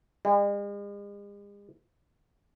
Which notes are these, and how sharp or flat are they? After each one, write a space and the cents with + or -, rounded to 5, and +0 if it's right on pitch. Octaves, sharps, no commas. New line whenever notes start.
G#3 -45